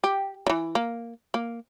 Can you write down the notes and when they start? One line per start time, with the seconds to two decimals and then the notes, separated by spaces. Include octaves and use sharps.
0.04 G4
0.47 C#3 E3
0.75 A#3
1.34 A#3